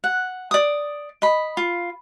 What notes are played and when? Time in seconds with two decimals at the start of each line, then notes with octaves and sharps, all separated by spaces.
0.04 F#5
0.51 D5 D#6
1.22 D#5 B5
1.57 F4